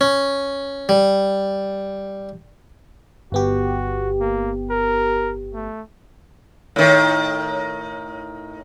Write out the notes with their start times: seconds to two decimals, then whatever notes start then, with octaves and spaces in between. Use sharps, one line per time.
0.01 C#4
0.89 G3
3.32 G1 B3 F#4 G4
4.20 A#3
4.70 A#4
5.54 A3
6.76 A2 D#3